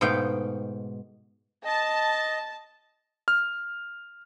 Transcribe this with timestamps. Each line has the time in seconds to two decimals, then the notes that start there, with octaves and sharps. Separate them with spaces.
0.01 G#2 B2 A3 F5 G5
1.65 D#5 A5
3.28 F6